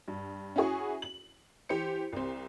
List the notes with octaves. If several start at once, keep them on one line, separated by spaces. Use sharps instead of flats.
G2
C#4 E4 F#4 G#4 C#6
F#7
E3 G4 C5 C#7
C2 C4